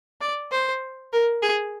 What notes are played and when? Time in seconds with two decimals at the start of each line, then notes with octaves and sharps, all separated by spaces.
0.21 D5
0.52 C5
1.12 A#4
1.43 G#4